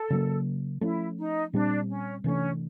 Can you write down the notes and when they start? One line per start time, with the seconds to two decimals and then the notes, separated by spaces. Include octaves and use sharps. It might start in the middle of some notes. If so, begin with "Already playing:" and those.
Already playing: A4
0.10 C#3 F#3 A#3
0.81 F3 A3 C#4 E4
1.18 D#4
1.53 A#2 G3 C4 D4
1.89 C#4
2.24 C3 E3 A3 C#4 D4